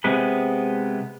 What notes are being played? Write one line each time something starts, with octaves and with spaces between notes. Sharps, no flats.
C3 G#3 B3 B4